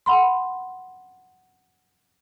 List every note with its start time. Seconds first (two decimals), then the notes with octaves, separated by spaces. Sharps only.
0.06 F#5 B5 C6